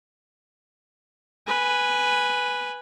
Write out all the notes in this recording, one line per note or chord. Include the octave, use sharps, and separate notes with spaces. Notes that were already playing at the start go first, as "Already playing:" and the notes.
B4 G#5